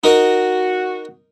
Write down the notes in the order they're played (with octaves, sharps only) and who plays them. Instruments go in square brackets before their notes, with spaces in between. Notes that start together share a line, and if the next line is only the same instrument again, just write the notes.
[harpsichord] D#4 A#4 D#5 [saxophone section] F#4